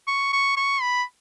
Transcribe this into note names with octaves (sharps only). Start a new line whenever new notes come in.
C#6
C#6
C#6
B5